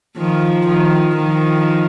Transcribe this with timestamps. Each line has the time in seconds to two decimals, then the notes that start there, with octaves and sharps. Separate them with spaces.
0.17 D#3 F3
0.67 D#3 F3
1.16 D#3 F3